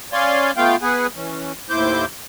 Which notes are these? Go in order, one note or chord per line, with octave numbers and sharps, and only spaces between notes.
C#4 C#5 D5 F5 G#5 C6
A3 B3 F4 F5 G5
B3 G#4 B4 F#5 G#5
E3 C#4
D#2 A2 E4 C5 D6 G6